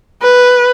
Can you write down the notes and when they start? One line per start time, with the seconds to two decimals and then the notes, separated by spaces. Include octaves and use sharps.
0.22 B4